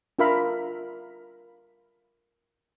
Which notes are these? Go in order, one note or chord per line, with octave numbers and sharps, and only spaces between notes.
D4 F4 A#4 E5 F5 B5